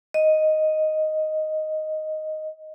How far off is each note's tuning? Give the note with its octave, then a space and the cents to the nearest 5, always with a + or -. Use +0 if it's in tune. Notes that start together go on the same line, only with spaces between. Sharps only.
D#5 +0